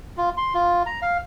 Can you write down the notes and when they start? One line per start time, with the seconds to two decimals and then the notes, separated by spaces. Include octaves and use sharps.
0.17 F4
0.37 C6
0.54 F4
0.86 A#5
1.02 F5